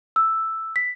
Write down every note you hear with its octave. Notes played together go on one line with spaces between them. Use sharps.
E6
B6